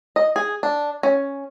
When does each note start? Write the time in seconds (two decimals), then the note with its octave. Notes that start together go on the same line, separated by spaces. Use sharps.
0.16 D#5
0.36 G#4
0.63 D4
1.03 C#4